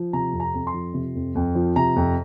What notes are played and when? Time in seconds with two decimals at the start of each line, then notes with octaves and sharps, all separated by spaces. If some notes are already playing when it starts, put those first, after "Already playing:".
Already playing: F3
0.13 C3 A#5
0.33 F2
0.40 A#5
0.54 F2
0.67 C6
0.73 F3
0.94 C3
1.15 F2
1.35 F2
1.55 F3
1.76 C3 A#5
1.96 F2